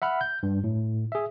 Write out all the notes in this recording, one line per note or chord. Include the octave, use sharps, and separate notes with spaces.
E5 F#5 B5 F6
G6
G2
A2
G#4 E5